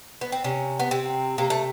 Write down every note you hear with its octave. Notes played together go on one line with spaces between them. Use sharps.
B3
C4
C3 C#4
B3
C3 C4
C3 A#3
A3